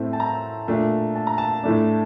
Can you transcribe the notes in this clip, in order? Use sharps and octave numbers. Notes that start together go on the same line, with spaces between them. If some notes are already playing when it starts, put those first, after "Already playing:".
Already playing: A2 A3 C4
A5
A#5
A#2 A3 D4
A5
A#5
A5
A2 A3 D4